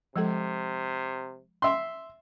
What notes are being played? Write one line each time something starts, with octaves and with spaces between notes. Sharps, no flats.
C3 F3 G#3 A4
E5 C6